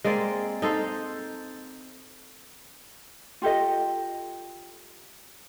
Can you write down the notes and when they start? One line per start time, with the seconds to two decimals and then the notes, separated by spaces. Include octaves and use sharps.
0.04 G#3 A#3 C4 D5
0.62 D#4 A4 C5 F5
3.42 F4 G4 A4 D#5